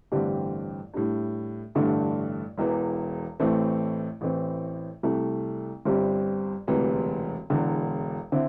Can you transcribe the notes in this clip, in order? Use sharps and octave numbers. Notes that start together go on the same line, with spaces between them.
A1 G2 D3 C4 G4
A2 G3 D4
A1 G2 D3 A3 D4
E1 E2 E3
A1 A2 E3 A3 C4
A1 A2 E3 C4
C2 C3 A3
G1 G2 G3 C4 G4
E1 D2 C3 E3 G3
E1 E2 D3
D3 C4 E4